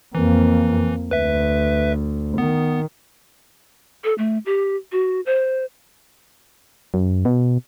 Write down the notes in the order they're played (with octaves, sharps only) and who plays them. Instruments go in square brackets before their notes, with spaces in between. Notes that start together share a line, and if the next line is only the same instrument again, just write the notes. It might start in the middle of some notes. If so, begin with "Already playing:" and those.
[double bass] F2 A#3 [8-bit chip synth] E3
[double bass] D2 [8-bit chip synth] B4 E5
[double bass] D#3 [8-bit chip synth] B3
[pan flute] A4
A3
G4
F#4
C5
[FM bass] F#2
B2